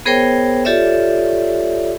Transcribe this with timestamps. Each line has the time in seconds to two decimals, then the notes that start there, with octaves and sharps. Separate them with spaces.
0.06 B3 G#4 A#4 C5 C#5 G5
0.65 F4 G4 A4 C#5 D5 E5